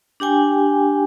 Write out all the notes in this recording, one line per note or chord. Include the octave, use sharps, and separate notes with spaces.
D4 G4 G5 G#5